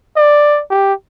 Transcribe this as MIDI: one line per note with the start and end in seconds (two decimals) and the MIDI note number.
0.17 0.62 74
0.71 0.94 67